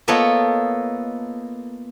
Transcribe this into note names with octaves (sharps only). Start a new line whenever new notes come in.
A#3 B3 F4 A4 C#5 D#5